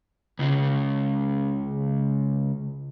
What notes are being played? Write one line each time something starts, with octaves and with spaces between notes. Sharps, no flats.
C#2 C#3